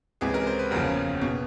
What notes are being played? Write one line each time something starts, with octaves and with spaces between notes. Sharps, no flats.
C#2 C3 E3 G#4
A#4
C5
B4
F#1 E2 C#3 F3 A#4
B2